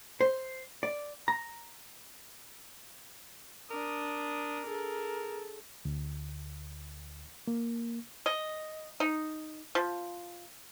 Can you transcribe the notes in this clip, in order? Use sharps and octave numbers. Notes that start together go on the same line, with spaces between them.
C5
D5
A#5
D4 A#4 D#6
G#4 A4
D2
A#3
D#5
D#4
F3